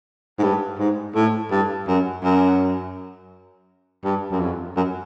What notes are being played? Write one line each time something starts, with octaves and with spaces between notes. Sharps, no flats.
G#2
G2
G#2
A2
G2
F#2
F#2
G2
F#2
F2
F#2